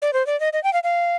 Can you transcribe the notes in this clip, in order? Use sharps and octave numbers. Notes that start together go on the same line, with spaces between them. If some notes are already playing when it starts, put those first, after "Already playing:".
D5
C5
D5
D#5
D#5
G5
F5
F5